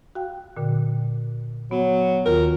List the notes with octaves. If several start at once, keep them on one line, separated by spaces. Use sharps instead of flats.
F#4 F5 G5
A#2 D3
F#3 B3
D#2 D#3 F4 A#4